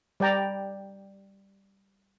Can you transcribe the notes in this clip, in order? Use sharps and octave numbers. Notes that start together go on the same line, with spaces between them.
G3 D5 G5 A#5